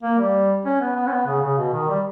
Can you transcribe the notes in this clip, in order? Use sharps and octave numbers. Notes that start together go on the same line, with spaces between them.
A#3
G3
C#4
B3
B3
C#4
B3
C#3
C#3
B2
D#3
G3